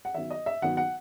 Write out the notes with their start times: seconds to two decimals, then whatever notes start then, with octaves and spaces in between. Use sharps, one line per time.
0.05 F#5
0.14 D#3 F#3 B3 E5
0.31 D#5
0.46 E5
0.62 D#3 F#3 B3 F#5
0.77 F#5